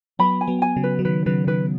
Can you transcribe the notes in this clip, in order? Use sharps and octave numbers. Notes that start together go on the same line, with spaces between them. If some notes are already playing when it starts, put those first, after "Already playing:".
F#3 B3 B5
G#5
F#3 B3
G#5
C#3 F#3
B4
F#3
D#3 B4
C#3 F#3 B4
D#3 B4